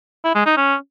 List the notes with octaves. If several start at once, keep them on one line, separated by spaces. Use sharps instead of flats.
E4
G#3
D#4
C#4